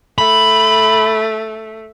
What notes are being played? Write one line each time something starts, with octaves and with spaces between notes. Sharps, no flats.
A3 B5